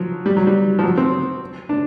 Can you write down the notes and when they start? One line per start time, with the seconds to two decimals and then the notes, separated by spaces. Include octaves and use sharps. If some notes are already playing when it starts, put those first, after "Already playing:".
Already playing: F3 F#3
0.26 G3
0.37 F#3
0.47 G3
0.79 F3
0.84 F#3
0.97 C4
1.69 D4